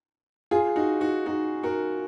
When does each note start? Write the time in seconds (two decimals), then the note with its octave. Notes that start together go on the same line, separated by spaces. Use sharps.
0.51 F4 G#4
0.76 D#4 F#4
1.01 D#4 F#4
1.26 D#4 F#4
1.63 F#4 A#4